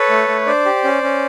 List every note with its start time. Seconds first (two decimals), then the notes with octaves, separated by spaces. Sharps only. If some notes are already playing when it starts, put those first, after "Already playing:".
Already playing: A4 B4 C#5
0.10 A3
0.28 A3
0.47 D4 C5 D5
0.65 G4
0.84 C#4
1.03 C#4